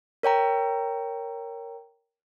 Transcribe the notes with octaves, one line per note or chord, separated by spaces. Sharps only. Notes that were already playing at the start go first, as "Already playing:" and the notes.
A#4 C#5 G5 A#5